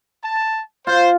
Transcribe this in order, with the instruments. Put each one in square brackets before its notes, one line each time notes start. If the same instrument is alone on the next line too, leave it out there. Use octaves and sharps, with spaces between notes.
[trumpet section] A5
[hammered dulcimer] F4 [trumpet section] C5